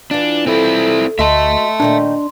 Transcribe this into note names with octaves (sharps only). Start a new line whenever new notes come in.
E3 D4 F4
C4 E4 A4
D2 F#4 D#5 E5 A5 C6
A#2 D#3 A3 D4